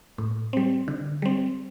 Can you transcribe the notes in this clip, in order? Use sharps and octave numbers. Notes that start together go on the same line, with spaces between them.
A2
G3 C4
D3
G3 C4